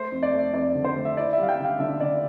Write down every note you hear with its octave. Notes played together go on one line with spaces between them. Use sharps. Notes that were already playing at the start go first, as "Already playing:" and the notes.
Already playing: A3 C5
F2
D5
A3
F2 D5
D3
C5
A3
E5
E4 D5
G3 E5
F5
G5
D3
F5
D3 E5
D3 D5